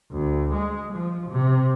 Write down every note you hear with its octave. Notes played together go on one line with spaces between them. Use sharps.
D2
G#3
F3
C3